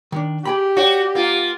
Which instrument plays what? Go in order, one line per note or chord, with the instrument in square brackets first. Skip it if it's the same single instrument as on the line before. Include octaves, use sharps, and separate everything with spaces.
[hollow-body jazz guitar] D#3 D4
[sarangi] G4 [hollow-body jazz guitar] G#4 G5 B5
[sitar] F#4 [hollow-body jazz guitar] C#5 D5 G5
[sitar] A#3 F4